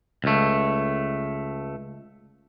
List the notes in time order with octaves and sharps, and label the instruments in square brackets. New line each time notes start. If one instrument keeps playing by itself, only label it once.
[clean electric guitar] C#2 A3